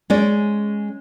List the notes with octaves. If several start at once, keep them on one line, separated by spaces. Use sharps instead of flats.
G#3 C#4 D5